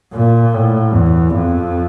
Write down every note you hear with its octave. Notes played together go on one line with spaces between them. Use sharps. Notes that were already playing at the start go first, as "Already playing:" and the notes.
A#2
A2
E2
F2